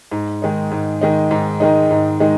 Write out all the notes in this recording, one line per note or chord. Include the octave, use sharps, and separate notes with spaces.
G#2
D#3 G#3 D#4
G#2
D#3 G#3 D#4
G#2
D#3 G#3 D#4
G#2
D#3 G#3 D#4